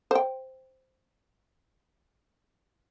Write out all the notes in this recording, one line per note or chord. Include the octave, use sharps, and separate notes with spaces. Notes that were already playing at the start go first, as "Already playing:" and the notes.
C5 G5